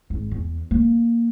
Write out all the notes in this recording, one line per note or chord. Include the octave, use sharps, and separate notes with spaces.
G#1
E2
A#3